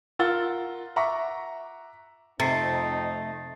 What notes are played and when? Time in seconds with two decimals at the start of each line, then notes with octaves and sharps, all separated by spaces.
0.19 F4 A#4 F#5 E6 A6 G7
0.96 E5 F#5 A#5 C#6 D6
2.40 F2 C3 A3 C4 D#4 A6 C7